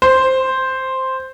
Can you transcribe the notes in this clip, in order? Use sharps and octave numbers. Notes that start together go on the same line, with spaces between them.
C5